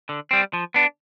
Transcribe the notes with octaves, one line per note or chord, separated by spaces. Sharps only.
D3
G3 C4
F3
B3 D4